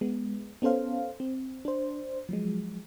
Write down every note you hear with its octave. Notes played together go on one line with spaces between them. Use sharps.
G#3 B3
B3 C#4 A4 C5 F5
C4
D4 C5
F3 F#3 G#3